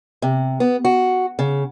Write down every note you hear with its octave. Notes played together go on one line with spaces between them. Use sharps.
C3
B3
F#4
C#3